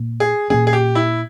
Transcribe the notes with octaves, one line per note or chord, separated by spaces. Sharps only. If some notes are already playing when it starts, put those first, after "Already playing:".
Already playing: A#2 A#3
G#4
A#2 A#3 C#4 G#4
G#4
G4
E4